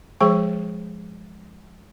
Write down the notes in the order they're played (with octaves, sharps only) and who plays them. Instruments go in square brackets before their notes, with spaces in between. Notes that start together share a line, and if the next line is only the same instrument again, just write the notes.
[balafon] F3 G#3 G#4 C5 G5 C#6